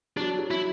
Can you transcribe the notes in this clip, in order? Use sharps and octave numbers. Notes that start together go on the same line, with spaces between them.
F#3 D4
F#3
E4